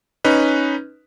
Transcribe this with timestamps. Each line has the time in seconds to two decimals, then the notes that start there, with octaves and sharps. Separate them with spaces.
0.24 C#4 D#4 B4